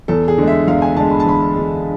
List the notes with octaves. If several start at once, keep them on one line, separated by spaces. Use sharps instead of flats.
E2 A4
G#4
D3 G#3
E5
E2 F5
G#5
D3 G#3 A5
B5
A5
E2 B5
D3 G#3